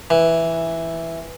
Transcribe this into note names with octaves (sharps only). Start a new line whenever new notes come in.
E3